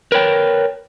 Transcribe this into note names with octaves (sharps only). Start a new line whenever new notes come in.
A#4 B4 C#5 G5